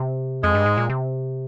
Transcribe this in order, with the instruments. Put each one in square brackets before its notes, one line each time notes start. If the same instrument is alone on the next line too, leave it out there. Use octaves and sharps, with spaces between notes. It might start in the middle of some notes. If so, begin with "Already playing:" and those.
Already playing: [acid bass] C3
[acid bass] F2 [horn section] G#3
[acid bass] G2
G#2
A#2
C3